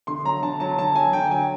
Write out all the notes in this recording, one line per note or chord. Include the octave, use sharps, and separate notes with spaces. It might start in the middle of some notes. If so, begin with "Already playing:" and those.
D3 C6
F#3 A#5
D3 A5
F#3 A5
D3 A5
F#3 G#5
D3 G5
F#3 G#5